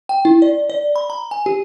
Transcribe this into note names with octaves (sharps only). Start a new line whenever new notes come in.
G5
E4
D5
D5
B5
A#5
G#5
G4